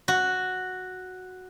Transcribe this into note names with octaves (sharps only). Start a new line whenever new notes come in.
F#4